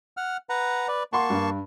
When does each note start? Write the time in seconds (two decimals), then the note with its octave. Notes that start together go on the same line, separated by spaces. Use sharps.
0.17 F#5 F6
0.49 B4 F#5 A#5
0.88 B4 D5
1.13 A#3 F#5 A5 C6 C#6
1.30 G2